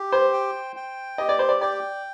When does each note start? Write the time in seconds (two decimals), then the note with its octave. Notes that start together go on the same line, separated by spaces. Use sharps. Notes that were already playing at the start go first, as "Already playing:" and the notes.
Already playing: G4
0.12 C5
0.33 G5
0.76 G5
1.18 G4 D#5
1.29 D5
1.39 C5
1.49 D5
1.61 D5 G5